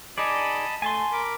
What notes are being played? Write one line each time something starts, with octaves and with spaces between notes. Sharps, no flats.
D#4 G#4 D5 D#5 A5 B5
A3 G#5 A5 C6
A#4 B5 D6